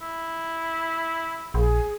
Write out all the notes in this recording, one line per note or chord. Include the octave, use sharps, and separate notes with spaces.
E4
A#1 G#4